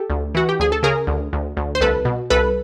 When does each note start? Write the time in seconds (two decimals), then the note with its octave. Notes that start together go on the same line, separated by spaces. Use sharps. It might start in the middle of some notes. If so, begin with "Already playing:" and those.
Already playing: G4 A4
0.10 D2
0.35 E3 F#4
0.49 G4
0.59 D2 G#4
0.72 A4
0.83 C#3 G#4 A#4
1.07 D2
1.33 D2
1.57 D2
1.75 C5
1.81 C2 A4 B4
2.05 B2
2.30 C2 A4 B4